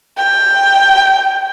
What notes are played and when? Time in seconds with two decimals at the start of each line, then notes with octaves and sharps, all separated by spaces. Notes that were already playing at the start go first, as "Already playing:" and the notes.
0.17 G5